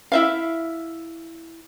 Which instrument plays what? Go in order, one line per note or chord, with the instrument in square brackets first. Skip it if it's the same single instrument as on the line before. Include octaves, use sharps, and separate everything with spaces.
[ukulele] E4 E5 F5